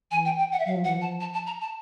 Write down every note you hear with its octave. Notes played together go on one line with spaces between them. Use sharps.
E3 G#5
G5
G5
F#5
E5
F#3 F5
F3
E3 F#5
F3
A5
A5
A5
A#5
A5